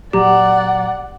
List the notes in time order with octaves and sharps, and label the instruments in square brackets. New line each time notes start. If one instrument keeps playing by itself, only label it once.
[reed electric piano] A#2 F#3 A#5 [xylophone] G4 [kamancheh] D5 F#5